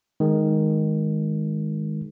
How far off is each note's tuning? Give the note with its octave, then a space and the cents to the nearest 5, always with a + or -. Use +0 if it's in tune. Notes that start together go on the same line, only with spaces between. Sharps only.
D#3 +0 G#3 +0